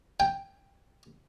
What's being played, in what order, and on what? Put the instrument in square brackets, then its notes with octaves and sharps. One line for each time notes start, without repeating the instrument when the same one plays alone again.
[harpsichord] G5